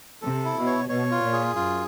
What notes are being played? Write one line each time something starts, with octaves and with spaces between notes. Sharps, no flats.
C3 A4
E4
B2
C#5
B2 C#5
F4
A#2
G#4
F#2 F4